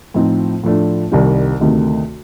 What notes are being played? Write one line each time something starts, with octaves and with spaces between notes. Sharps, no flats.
A2 F3 C4 D#4
A2 F3 A3 D4
C2 C3 D#3 G3 C4
D2 C3 D#3 A3 D#4